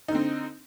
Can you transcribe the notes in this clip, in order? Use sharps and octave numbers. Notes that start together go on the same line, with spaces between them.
D3 C4 D#4